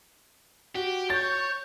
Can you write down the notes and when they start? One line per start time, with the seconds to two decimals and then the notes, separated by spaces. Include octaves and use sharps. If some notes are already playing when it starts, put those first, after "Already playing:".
0.75 F#4 G4
1.10 C#5 C#6 G6 A6